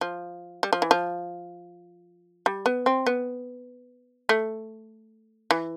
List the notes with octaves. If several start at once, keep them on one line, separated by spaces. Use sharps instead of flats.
F3
G3
F3
E3
F3
G3
B3
C4
B3
A3
E3